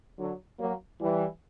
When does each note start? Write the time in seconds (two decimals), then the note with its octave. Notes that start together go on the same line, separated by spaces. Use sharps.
0.18 D3 F#3
0.59 F#3 A#3
1.00 E3 G3